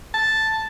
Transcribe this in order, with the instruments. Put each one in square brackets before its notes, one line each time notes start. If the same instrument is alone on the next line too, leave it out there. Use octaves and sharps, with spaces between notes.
[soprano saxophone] A5